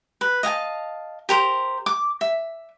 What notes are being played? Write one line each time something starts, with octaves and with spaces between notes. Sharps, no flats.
B4
D#5 F5 G#5 A5
G4 A#4 C5
D6
E5